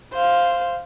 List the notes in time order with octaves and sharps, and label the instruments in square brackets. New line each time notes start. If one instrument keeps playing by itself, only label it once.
[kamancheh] C5 F5